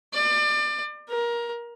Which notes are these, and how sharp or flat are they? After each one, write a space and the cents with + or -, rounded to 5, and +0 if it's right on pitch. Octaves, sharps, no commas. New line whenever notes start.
D5 +30
A#4 +20